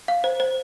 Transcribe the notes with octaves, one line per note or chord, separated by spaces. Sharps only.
F5
C5
C5